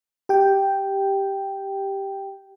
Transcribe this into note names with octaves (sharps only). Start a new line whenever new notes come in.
G4 G5